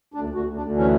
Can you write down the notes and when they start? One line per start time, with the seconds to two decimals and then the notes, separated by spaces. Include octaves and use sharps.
0.14 D2 D4
0.29 D2
0.35 F#4
0.46 D2
0.56 D4
0.61 D2
0.76 E3 C#4